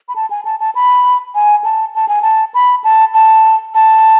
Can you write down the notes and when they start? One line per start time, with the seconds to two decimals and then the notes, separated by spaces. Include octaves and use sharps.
0.08 B5
0.16 A5
0.30 G#5
0.45 A5
0.60 A5
0.75 B5
1.35 G#5
1.64 A5
1.95 A5
2.08 G#5
2.22 A5
2.54 B5
2.84 A5
3.14 A5
3.74 A5